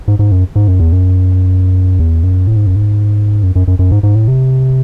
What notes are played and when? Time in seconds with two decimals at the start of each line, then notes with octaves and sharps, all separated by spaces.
0.08 G#2
0.19 G#2
0.32 F#2
0.56 G#2
0.68 F#2
0.80 E2
0.92 F#2
1.99 E2
2.23 F#2
2.47 A2
2.57 G#2
2.66 F#2
2.76 G#2
3.43 F#2
3.55 F#2
3.68 F#2
3.79 F#2
3.91 G#2
4.03 G#2
4.15 A2
4.28 C3